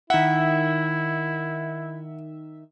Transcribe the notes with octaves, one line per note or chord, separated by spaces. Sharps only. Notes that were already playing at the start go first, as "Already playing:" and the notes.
D#3 E4 E5 F#5